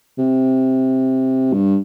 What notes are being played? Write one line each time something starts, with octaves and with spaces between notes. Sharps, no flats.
C3
G2